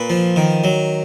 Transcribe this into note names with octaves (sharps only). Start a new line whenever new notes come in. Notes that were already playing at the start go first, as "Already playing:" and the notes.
Already playing: A#2 B4
F3
D#3
F#3